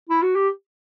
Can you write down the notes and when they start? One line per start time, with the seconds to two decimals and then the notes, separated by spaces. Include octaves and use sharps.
0.09 E4
0.22 F#4
0.35 G4